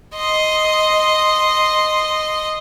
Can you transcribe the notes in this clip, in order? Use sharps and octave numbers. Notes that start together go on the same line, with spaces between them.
D#5 C6